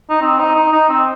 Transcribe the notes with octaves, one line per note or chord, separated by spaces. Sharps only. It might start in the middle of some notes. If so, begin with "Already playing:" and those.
D#4
C4
D#4
D#4
D#4
C4